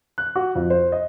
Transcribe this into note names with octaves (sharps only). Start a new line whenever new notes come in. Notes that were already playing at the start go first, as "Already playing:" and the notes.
F#6
F#4
F2
C5
D#5